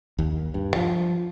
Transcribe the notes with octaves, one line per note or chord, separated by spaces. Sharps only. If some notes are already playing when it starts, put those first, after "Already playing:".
D#2
G2
F3